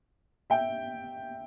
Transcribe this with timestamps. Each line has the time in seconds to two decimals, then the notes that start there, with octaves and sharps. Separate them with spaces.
0.50 E5 G5